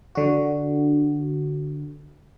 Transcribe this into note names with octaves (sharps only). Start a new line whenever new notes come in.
D3 F#4